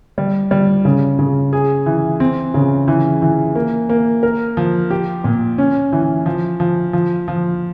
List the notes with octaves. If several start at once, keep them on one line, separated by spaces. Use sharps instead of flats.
G3
G3
C#3
C#3
G#4
E3
C4
C#3
E3
E3
A#3
A#3
A#4
F3
G4
A#2
C#4
E3
F3
F3
F3
F3